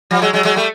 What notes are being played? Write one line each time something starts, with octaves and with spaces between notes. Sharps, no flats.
F3 G3
F#3 G#3
F#3 G#3
F#3 G#3
G3 A3